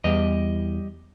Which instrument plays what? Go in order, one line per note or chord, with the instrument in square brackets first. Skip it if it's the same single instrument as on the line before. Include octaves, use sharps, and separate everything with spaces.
[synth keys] E2 [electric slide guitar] G3 G4 D#5